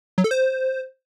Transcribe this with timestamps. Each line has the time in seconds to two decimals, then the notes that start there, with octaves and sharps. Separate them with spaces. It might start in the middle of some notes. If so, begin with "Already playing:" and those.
0.18 F#3
0.24 A4
0.31 C5